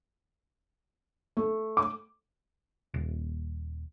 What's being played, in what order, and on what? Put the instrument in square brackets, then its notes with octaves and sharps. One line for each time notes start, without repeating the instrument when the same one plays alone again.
[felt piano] A3
D6
[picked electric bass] D#1